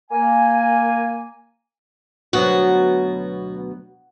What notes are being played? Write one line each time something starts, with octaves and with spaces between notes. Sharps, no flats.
A#3 G#5
D2 B2 F#3 F#4